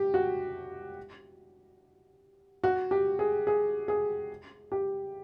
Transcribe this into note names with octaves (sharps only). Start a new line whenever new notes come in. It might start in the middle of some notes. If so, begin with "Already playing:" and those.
Already playing: G4
F#4
F#4
G4
G#4
G#4
G#4
G4